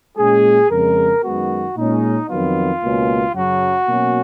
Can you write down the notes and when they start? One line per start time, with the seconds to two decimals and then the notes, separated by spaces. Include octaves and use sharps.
0.18 A#2 G#3 C#4 G#4
0.70 F2 C#3 G#3 A#4
1.23 F#2 D#3 G#3 B3 F#4
1.76 A#2 G#3 C#4 D#4
2.29 F2 D#3 F#3 B3 F4
2.82 C#2 B2 A#3 C#4
3.34 F#2 C#3 F#3 F#4
3.87 B2 F#3 A#3 C#4